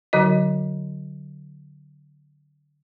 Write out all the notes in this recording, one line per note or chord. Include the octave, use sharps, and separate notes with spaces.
D3 F#3 F#4 D#5